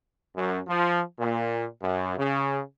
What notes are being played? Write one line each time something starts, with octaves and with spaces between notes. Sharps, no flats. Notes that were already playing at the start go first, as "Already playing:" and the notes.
F#2
F3
A#2
F#2
C#3